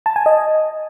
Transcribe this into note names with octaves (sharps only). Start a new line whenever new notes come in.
A5
G#5
D#5